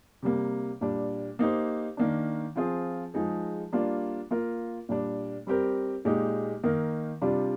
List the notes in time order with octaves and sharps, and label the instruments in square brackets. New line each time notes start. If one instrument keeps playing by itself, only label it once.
[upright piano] C3 G3 A#3
A#2 G3 D4
A#3 D#4 G4 C5
D#3 A#3 D4
F3 C4 F4 G#4
F3 G#3 D#4 G#4
G3 A#3 D4 F4
A#3 F4 A#4
A#2 G3 D4
G3 C4 G4 A#4
A#2 G#3 D#4 G4
D#3 A#3 D#4 A#4
C3 G3 D4 F4